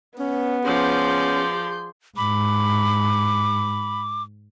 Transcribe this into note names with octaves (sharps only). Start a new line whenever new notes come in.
B3 C#4
F3 C#4 G#4 D5 C6 G6
G#2 B5 D6